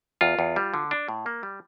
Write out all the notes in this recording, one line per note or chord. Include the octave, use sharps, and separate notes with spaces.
E2 F4
E2
G3
D3
D4
A2
A#3
G3